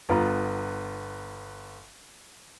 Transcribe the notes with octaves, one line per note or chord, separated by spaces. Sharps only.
G1 B3 F4 A#5